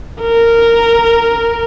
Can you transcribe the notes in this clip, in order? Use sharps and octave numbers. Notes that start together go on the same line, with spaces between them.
A#4